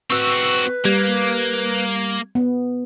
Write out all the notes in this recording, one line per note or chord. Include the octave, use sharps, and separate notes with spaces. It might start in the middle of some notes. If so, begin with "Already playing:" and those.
C4 F#4 B4 C#6 E6
G3 A#3 G#6
B3